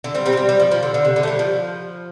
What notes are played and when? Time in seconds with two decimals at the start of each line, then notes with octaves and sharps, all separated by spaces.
0.04 D3
0.15 G3 C4
0.26 G3 C4
0.33 F3
0.37 G3
0.49 G3
0.60 F3
0.71 F3
0.83 D3
0.94 D3
1.05 C3
1.16 D3
1.23 A3
1.27 G3
1.39 F3